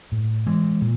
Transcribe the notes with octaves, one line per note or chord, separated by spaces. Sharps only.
A2
E3 G#3
A#2